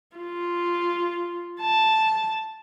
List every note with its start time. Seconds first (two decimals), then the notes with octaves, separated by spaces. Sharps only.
0.17 F4
1.61 A5